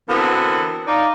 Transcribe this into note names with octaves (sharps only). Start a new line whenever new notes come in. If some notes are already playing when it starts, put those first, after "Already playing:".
D3 E3 B3 C4 F#4 A#4
D#4 D5 F5